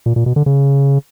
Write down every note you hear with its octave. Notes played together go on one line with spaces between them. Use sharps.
A#2
A#2
B2
D3
C#3